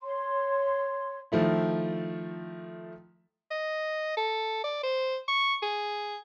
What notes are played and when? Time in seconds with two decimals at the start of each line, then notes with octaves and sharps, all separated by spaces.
0.01 C#5 C6
1.32 D#3 F3 A3 E4
3.51 D#5
4.17 A4
4.64 D5
4.83 C5
5.28 C#6
5.62 G#4